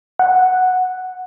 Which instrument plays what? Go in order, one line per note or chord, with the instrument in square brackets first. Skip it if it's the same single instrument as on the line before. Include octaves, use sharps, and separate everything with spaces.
[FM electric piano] F#5